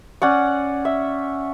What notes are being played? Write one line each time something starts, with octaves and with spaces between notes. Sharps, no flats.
C#4 D5 F#5
E5